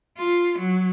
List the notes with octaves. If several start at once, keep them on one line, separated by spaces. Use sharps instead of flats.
F4
F#3